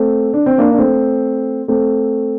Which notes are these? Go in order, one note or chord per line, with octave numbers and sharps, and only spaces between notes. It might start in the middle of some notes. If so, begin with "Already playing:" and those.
Already playing: A3 C4
D4
C4
A#3 D4
D4
A3 C4
A3 C4